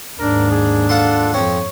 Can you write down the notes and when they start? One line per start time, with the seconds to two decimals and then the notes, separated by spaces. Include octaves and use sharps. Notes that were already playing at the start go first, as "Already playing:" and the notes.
0.19 D#2 G#2 D4 A#4
0.51 G#4
0.89 F4 A4 F#5 C6
1.34 F2 C4 C#5